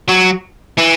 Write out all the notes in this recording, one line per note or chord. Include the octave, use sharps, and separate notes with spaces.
F#3
E3